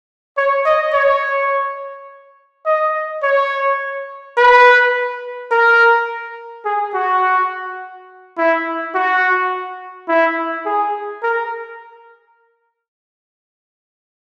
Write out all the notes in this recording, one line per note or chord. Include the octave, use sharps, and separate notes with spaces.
C#5
D#5
C#5
D#5
C#5
B4
A#4
G#4
F#4
E4
F#4
E4
G#4
A#4